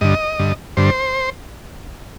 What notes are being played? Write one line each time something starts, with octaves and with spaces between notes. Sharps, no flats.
G2 D3 D#5
G2 D3
G2 D3 C5